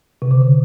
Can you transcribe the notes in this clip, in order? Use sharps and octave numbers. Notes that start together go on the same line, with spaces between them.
C3
C#3
D3